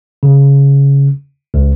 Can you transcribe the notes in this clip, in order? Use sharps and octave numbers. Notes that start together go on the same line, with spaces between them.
C#3
C#2